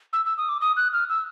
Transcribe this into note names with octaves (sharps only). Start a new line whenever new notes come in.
E6
E6
D#6
D6
D#6
F#6
F6
E6